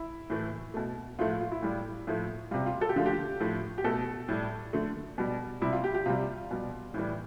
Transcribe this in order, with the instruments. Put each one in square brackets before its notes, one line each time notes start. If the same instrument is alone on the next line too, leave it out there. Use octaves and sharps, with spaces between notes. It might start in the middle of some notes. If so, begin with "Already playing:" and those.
Already playing: [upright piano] E4
A2 E3 A3
B2 A3
A2 F3 A3 F4
F4
F4
E4
A2 G3
A2 F3 A3
C3 G3 F4
F4
A4
G4
D3 F3 A3 F4
G4
A2 F3 A3
G4
B2 A3 A4
A2 G3
D3 A3
B2 G3
C3 G3 E4
F4
G4
G4
C3 G3 F4
B2 G3
A2 E3 G3